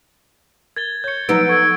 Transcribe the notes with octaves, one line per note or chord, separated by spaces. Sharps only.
A#4 G#6 A6 G7
C#5 C#6 G6 G#6 C#7
F3 F#3 B3 D#4 E6 D7
A4 C#6 E6 G#6